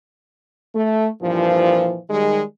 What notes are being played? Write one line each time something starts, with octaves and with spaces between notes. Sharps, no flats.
A3
G2 A#2 E3 F3
D#3 G3 G#3